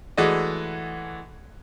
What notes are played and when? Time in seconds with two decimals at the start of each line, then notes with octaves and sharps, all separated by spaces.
0.18 E3 G#3 A3 F#4 D5 D#5